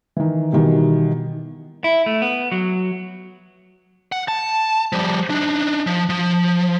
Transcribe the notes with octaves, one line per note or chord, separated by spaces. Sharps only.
D#3 E3
B2 D#3 E3 G3
E4
A3
B3
F#3
F#5
A5
F3 G3
D4 D#4
F3
F3